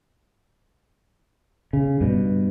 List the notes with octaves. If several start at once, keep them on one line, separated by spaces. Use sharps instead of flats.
C#3
G2 B2